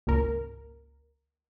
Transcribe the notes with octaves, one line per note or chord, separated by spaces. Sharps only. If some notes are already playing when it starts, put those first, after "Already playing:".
G#1 C#2 A#3 A#4